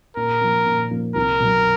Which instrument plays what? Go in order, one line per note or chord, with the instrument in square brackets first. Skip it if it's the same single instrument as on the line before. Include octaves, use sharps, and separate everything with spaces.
[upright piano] A#2 [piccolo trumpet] A#4
[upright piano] F3 A#3
A#2
F3 A#3
[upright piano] C2 [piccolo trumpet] A#4
[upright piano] B2 F#3